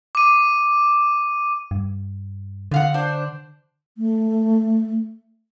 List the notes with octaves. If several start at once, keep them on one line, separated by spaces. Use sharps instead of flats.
D6 D#7
G2
F2 D3 F5 F#5
D4 C5
A3